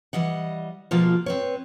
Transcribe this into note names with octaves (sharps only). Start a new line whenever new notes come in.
E3 G3 D#5 F#5
B2 F3 G#3 A#3 F4
C4 B4 C#5